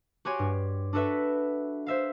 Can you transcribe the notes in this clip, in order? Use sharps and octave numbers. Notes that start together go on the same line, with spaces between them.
F#4 G4 C#5 G#5 C6
G2
D4 F#4 A4 B4 E5
C5 E5 F5